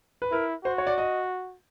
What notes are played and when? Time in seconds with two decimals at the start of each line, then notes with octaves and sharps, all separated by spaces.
0.22 B4
0.32 E4 A#4
0.65 F#4 C5
0.78 C#5
0.87 D5
0.98 D#5